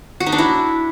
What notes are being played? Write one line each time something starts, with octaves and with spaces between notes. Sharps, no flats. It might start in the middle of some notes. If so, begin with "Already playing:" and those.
F#4
D#4
D4
E4